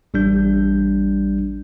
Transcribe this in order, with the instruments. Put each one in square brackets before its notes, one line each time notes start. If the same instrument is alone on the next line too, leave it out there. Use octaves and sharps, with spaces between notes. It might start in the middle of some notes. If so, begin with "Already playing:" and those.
[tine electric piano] A1 G3 D4 G6